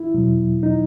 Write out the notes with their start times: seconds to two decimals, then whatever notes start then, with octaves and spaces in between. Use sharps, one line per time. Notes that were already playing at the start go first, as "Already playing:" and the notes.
Already playing: E4
0.14 E2 B2 F#3
0.63 D#4